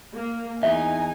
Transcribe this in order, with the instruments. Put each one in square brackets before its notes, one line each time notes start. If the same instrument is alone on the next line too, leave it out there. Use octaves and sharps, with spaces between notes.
[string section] A#3
[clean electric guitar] E2 [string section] D#4 G#5 [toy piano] E5